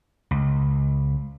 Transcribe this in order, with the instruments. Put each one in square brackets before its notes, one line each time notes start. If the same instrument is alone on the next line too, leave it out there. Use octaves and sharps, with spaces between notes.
[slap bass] C#2